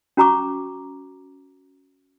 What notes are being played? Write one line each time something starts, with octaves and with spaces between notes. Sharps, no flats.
C#4 F#4 A#5 C#6 D6